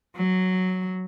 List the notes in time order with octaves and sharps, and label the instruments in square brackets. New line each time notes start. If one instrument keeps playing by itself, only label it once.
[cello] F#3